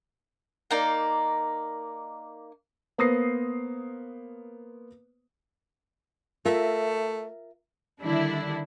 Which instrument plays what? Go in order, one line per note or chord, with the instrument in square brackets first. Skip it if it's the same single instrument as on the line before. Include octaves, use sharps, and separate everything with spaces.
[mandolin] A#3 D#4 D5
[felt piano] A#3 B3 C5 D#6 A#6 C7
[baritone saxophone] A3 [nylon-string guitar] F4 A#4 E5
[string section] D3 D#3 G3 D4 E4